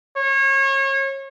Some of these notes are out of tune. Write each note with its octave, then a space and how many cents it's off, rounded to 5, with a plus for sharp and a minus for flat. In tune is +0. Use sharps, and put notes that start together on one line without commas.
C#5 -30